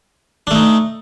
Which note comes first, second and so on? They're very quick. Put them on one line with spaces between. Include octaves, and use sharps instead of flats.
D4 A3 D#4